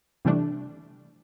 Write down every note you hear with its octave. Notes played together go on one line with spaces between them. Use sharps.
C3 E3 G3 A3 D4